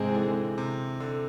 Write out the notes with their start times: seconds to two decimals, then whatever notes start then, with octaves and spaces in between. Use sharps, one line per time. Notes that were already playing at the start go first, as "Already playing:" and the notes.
Already playing: G#2 C3 G#3 C4 G#4
0.09 E3
0.15 D3
0.58 C3
1.00 D3